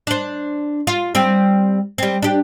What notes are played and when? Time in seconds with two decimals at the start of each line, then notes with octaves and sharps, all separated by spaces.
0.07 D4 C5
0.87 F4
1.15 G3 C4
1.98 G3 C4
2.22 D4 G4